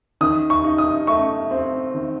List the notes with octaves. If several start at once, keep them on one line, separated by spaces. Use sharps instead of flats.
D#3 D#6
C#6
D#4
D#6
A3 C#6
C4
D#3